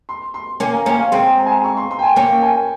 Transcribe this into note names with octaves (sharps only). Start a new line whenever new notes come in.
C6
C6
A#3 C#4 G#5
A#5
A#3 C#4 G#5
F5
G#3 C4 C6
A#5
G#5
A#5
C#6
C6
C6
G5
G#5
A#3 C#4 G5
G#5